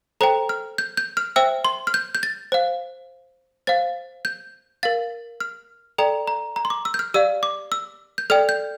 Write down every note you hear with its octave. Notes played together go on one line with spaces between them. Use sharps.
A4 C5 G5 A#5
F6
G6
G6
F6
C5 E5 G5 E6
C6
F6
G6
G6
A6
C5 F5
C5 F5 A6
G6
A#4 F5 A6
F6
A4 D5 G5 A#5
A#5
A#5
C6
D6
E6
G6
F6
G4 D5 F5 E6
D6
E6
G6
A4 D5 G5 F6
G6